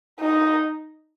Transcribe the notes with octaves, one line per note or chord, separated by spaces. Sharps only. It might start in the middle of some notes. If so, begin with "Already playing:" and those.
D#4